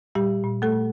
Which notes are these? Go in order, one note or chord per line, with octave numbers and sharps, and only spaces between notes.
A#2 G3 G4
A#2
A3 A4
A#2